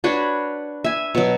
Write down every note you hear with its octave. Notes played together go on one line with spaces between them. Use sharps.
D4 F#4 B4 C#5
E5 G#5
B2 F#3